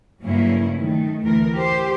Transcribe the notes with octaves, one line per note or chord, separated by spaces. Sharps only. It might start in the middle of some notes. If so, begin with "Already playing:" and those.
G2 C#3 F#3 A#3 C#4 E4
D#3 A3
D2 E3 A#4
G4 C5